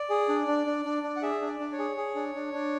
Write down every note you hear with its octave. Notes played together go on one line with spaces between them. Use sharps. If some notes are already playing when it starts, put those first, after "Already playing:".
Already playing: D5
G#4
D4
D4
D4
D4
D4
F#5
G#4 E5
D4
D5
D4
C#5
G#4
G#4
D4
D4
D4